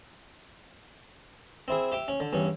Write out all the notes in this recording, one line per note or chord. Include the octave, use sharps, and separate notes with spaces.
C4 E4 G#4
G4 E5 G5
C#4
D3
E2 G2 C#4